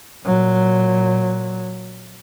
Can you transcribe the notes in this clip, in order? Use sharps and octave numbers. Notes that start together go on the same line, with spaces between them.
A#2 F#3